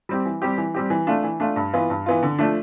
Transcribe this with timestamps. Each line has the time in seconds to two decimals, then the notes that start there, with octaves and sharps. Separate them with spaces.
0.09 G3 C4 G4
0.25 E3
0.42 G3 C4 G4
0.58 E3
0.75 G3 C4 G4
0.90 E3
1.07 A3 D4 F4
1.24 E3
1.40 A3 D4 F4
1.56 G2
1.74 E3 B3 F4
1.90 G2
2.06 E3 B3 F4
2.23 D3
2.39 F3 A3 D4